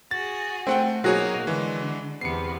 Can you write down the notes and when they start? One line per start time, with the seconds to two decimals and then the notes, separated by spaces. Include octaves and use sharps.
0.11 F#4 G#4 A6
0.67 A3 C4 F#5 G5
1.04 B2 F#3 A#3 D#4 F#4 G#4 C#5
1.47 D3 E3 G#3
2.21 E2 C3 B3 C7 C#7